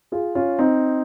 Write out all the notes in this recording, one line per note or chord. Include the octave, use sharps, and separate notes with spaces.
F4 G#4
C#4 F4
C4 D#4